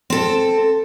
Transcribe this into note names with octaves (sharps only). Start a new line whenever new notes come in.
C4 A4